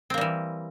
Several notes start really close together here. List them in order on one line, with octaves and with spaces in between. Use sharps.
C4 A#3 G3 E3